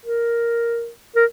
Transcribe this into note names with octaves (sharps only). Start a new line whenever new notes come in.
A#4
A#4